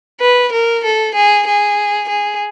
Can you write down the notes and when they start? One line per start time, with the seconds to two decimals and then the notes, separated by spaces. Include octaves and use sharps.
0.21 B4
0.52 A#4
0.84 A4
1.14 G#4
1.47 G#4
2.09 G#4